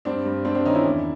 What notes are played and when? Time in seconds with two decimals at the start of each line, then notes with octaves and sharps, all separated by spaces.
0.05 G2 C4 D4
0.25 G2
0.45 G2 C4 D4
0.55 C4 D4
0.65 D#3 C#4 D#4
0.75 D4 E4
0.85 E2